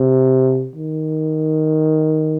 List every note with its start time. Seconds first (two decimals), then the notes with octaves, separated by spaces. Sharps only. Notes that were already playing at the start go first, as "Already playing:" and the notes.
Already playing: C3
0.76 D#3